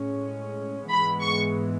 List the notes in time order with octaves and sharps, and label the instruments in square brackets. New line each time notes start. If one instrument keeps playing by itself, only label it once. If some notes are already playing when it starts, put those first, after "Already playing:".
Already playing: [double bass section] A2 G#3 C#4
[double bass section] G#2 E3 G#3 B3 [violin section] B5
[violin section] C#6